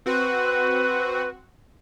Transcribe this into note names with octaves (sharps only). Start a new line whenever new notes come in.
C4 F#4 B4